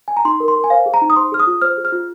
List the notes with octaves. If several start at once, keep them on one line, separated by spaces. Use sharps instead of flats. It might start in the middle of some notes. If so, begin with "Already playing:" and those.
G#5
A#5
D#4 C6
A#4
C6
A#4
G#5
C5 F5
G#4
A#5
D#4
D#6
C5 C6
G#4 F6
D#6
F4
C5 F6
G#4
F6
F4